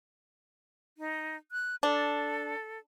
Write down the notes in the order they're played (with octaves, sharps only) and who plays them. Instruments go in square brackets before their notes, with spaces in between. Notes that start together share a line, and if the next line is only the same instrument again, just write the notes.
[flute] D#4
F#6
[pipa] D4 [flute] A4